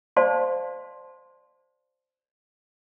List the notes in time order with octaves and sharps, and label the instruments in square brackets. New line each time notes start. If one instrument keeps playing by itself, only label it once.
[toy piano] C5 D5 F5 A5 C6